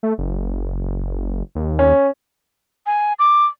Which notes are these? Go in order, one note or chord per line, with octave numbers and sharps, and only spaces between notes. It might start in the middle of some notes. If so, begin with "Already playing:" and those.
A3
F#1
D#2
C#4
G#5
D6